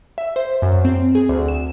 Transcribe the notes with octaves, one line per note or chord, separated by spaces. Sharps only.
E5
C5
F#2
C4
G#4
D2
E7